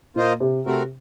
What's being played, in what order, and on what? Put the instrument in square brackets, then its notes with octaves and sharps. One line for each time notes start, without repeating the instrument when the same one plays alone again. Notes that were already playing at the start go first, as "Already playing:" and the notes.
[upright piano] A#2 [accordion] A#3 F4 C5 D#5
[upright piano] C3
[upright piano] C3 [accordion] A3 C4 F#4 A#4